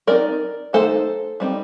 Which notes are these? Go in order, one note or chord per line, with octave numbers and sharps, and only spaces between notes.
G3 C4 D#4 A#4 D5
D#3 A3 D#4 A4 C5
G3 C4 D#4